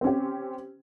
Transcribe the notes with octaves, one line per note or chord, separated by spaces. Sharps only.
C4 C#4 G4